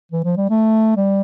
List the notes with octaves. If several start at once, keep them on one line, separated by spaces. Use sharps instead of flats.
E3
F3
G3
A3
G3